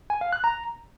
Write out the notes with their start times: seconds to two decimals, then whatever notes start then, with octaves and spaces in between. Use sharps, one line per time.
0.10 G#5
0.21 F5
0.33 F#6
0.44 A#5